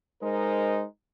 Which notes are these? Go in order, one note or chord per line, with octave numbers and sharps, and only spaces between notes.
G#3 D#4 A#4 C5